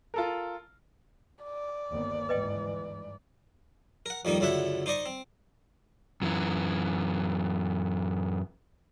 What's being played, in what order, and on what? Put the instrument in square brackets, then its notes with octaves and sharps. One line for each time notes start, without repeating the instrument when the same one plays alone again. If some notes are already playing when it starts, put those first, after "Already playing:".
[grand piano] F4 A4 A#4
[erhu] D5
[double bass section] G1 D#2 B3
[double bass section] G1 G#2 E3 [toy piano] B4 D#5 G5
[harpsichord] A#4 F#5
F2 D#3 G3 A#3 D#4
C#2 F#2 D3 E4 E5 F#5
D#4 C5 D5 D#5 C#6
C4
[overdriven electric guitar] F#2 E3